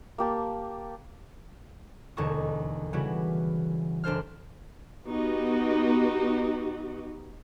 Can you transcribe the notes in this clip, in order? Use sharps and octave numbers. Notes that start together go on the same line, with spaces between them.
A#3 G4 A5
E1 D#2 D3 A4 C#6 D#6
C#3 E3 G3 B3 E4 F#4
F#1 D4 A4 C5 F6
B3 D#4 F#4 G4